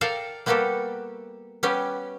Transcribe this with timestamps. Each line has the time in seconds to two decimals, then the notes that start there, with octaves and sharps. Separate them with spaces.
0.01 A4 A#4 D5 F5 G5 A5
0.46 G3 A#3 B3 F#4 G4 A4
1.63 G3 B3 C#4 G4